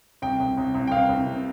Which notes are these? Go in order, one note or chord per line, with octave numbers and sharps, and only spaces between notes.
C2 G5
C2
C2
C2
G5
C2 F5
C2
C3